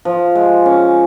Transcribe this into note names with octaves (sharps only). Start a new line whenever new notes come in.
F3
G#3
C#4